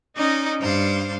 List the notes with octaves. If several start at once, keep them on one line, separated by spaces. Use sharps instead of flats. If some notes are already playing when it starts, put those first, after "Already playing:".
C#4 D#4 D5 D#5
G2 C5 F5